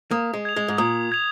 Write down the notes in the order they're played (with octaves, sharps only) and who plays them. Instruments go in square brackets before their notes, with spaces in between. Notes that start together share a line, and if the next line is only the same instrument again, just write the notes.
[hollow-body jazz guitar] A#3 [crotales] D#6
[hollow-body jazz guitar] G#3
[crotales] G#6 F7
[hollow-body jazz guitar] G#3
G#2
[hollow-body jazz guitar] A#2 [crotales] D#6
[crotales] G#6 F7